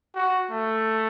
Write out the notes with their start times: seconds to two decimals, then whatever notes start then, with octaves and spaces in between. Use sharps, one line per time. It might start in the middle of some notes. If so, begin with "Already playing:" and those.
0.15 F#4
0.51 A3